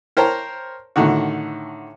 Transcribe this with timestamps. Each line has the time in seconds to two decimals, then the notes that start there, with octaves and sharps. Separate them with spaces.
0.17 A#4 C5 C#5 G5 A5 A#5
0.96 A2 D3 D#3 F#4